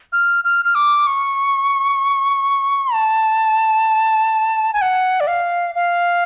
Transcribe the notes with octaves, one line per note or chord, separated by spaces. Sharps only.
F6
F6
F6
D6
C#6
A5
G#5
F#5
D5
F5
F5